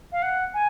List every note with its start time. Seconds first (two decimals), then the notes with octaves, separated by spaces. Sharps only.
0.12 F5
0.22 F#5
0.54 G#5